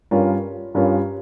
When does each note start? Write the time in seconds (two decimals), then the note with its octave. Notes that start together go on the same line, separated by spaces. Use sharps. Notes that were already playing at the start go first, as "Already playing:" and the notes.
0.11 G2 G3 C#4 F4 A#4
0.75 G2 G3 C#4 F4 A#4